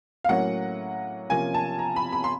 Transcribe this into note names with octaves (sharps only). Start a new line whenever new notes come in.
F5
A2 F#3 A#3 C#4 F#5
C3 F3 A#3 C#4 G#5
A5
A#5
B5
B5
C6